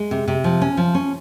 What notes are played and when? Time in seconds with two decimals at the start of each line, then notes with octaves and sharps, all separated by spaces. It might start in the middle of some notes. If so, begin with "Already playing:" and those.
Already playing: G#3
0.11 C3
0.28 C3
0.44 F3
0.61 C#4
0.77 F3
0.95 C#4